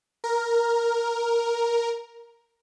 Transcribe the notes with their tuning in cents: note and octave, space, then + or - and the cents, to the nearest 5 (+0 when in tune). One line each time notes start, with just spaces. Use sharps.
A#4 +5